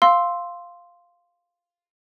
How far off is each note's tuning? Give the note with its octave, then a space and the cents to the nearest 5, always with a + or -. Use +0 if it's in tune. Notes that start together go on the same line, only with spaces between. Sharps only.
F5 +0 C6 +0 E6 +0